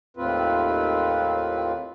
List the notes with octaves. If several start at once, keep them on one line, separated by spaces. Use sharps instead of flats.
D#2 A2 C4 F4 B4